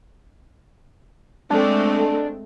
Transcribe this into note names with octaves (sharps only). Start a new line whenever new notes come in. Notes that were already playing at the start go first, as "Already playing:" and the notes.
G#3 A3 C4 D4